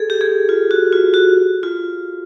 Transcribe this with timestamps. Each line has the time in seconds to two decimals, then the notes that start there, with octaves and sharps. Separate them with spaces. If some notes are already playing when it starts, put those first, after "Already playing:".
Already playing: G#4 A4
0.10 G4
0.21 G#4
0.49 F4
0.71 F#4
0.92 F4
1.14 F#4
1.63 F4